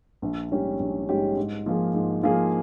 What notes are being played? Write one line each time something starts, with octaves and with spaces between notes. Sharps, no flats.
A#1
G#2 G3 C#4 G4
A#1
G#2 G3 C#4 G4
G#2
F3 A#3 F4 G#4
G#2
F3 A#3 F4 G#4